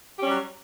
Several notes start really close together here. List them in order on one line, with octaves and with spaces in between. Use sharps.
G4 C#4 G3 F#3